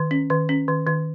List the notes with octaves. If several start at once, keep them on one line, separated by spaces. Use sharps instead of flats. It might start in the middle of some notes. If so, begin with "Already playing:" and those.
Already playing: D#3
C#4
D#3
C#4
D#3
D#3